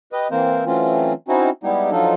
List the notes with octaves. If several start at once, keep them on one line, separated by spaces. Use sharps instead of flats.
G4 B4 D#5
E3 A#3 C4 A#4 C5
E3 F#3 A3 C4 C#4 F4
C4 C#4 D#4 E4 F#4
G3 G#3 B3 D#4 E4 G4
F3 F#3 D4 D#4 F4 A4